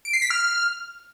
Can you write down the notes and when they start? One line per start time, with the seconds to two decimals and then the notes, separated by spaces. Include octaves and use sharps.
0.05 D7
0.13 C7
0.22 B6
0.30 F6